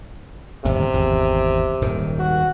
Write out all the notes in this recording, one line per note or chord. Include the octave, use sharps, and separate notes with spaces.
G1 D#2 A2 C3
G#1 E2
D#1 G#2 D#3
F#4